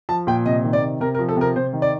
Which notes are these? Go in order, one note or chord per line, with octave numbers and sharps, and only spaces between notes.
F3 A5
A#2 G5
C3 D#5
D#3
D5
C3
C3 A#4
A#4
F3
A4
C3 A#4
C3 C5
D#3
D5